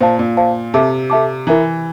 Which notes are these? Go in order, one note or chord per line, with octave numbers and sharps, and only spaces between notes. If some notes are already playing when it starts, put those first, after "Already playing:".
A#2 C5 F5 A5
A#2
C5 F5 A5
C3 A4 E5 A5 D6
A4 E5 A5 D6
E3 E4 A#4 E5 A#5